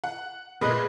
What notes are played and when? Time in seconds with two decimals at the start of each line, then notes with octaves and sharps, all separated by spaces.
0.04 F#5
0.61 A#2 G#3 A3 B4 D#5